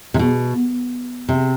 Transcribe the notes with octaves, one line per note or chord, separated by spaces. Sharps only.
C3
B2
C3